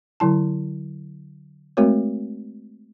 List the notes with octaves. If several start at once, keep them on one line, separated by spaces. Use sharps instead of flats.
D3 F#3 E4 A5
G#3 A3 C4 F#4 A#4 C#5